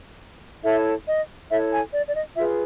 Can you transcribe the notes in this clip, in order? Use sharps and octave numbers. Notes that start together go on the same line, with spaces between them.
E4 A4 C#5 E5
D#5
E4 A4 C#5 E5
G#5
D5
D5
D#5
F4 G#4 B4 E5